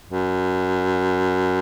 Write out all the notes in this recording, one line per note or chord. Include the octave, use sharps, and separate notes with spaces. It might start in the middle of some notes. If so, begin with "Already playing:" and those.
F#2